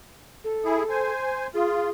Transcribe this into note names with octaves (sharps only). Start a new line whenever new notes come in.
A4
E4 G#4
C5 G#5
F4 G#4